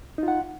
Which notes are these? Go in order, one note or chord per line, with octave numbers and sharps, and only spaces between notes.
D#4 F4 F#5